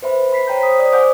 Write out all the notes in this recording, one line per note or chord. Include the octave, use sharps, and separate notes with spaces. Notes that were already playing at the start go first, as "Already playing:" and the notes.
B4 C5 E5 B5
B5 B6 C7
C5 C#5 G5 A#5 G6
C5 D#6 B6
D5 D#6
C5 D#5 F#5 G#5 D6 G6